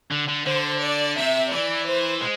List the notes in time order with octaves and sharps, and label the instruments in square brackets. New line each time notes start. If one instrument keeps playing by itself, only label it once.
[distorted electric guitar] D3
D3
[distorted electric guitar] D3 [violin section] C5
[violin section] D5
[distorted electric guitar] C3 [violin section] E5
[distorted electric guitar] E3 [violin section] D5
[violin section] C5
[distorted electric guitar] G#3